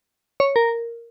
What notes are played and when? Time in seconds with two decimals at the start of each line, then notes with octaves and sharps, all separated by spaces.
0.40 C#5
0.56 A#4